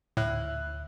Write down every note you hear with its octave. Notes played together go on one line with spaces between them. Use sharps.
D2 A2 E5 F#6